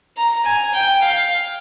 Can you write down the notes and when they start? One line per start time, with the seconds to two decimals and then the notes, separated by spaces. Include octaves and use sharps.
0.17 A#5
0.45 G#5
0.74 G5
1.02 F5